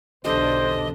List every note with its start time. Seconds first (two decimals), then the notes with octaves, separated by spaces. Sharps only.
0.24 B1 E2 D3 C4 D4 G4 C5 D#5